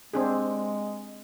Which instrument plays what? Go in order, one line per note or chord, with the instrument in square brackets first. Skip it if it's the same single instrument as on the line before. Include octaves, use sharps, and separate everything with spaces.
[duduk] G#3 [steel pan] C4 D4 G#4